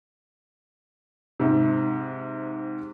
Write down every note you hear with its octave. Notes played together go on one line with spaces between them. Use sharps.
G#2 C3